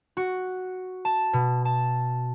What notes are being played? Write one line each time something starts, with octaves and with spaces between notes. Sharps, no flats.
F#4
A5
B2
A5